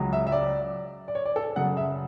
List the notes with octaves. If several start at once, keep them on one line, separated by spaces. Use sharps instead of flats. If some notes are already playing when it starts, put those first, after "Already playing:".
Already playing: C#2 C#3 F#3
E5
E5
D5
D5
C#5
D5
A4
F#2 C#3 F#3 F#5
E5